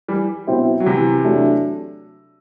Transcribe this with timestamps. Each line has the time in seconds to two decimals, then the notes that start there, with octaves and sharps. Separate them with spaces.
0.08 E3 G3
0.47 B2 F#3 C4 E4
0.80 F#3
0.86 C3 E3
1.24 F#3 A3 D4